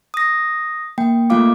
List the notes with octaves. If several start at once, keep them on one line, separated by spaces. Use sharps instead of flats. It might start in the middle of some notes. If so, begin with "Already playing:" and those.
D#6 A#6
A#3 G5
A3 A#3 F4 F5 D6